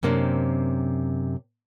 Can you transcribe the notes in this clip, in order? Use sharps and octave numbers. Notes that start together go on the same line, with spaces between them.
F#2 C3 A#3 C4 D4